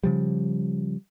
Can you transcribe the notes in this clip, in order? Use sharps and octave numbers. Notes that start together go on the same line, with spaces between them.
C#3 F3 G3